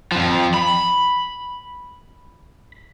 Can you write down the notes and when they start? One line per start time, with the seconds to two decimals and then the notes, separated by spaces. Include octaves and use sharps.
0.12 F2 F3
0.54 B5